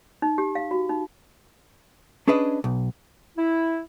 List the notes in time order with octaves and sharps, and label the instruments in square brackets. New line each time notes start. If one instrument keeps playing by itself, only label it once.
[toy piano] D#4
G4
F5
F#4
D#4
[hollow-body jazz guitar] C#4 D4 G#4 B4 D5 D#5
B1
[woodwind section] E4